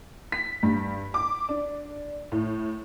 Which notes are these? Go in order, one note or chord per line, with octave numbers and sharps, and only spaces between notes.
B6
G2
D6
D4
A2